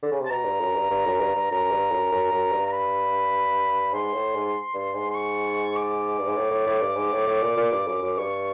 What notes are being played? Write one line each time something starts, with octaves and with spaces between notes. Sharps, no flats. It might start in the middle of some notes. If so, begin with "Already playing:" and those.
D3
C#3
C3
A5
B2 A#5
G2
F#2
G2
G2
F#2
G2
G2
F#2 A#5
G2
F#2
F#2
F#2
G2
A#5
B5
G#2 C6
A2
G#2
G2
G#2
C6
C#6
D6
G2
G#2
A2
A2
A2
G2
G#2
A2
A2
A#2
A#2
G2
F#2
F#2
G2 C#6